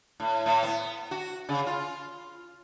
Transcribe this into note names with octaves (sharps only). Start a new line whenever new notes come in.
A2
A2
B3
F#4
C#3
F4